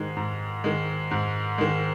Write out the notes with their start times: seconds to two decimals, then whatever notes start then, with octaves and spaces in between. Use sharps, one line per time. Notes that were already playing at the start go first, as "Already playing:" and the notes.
Already playing: G#2 D#3 G#3
0.17 G#2
0.64 D#3 G#3
1.11 G#2
1.58 D#3 G#3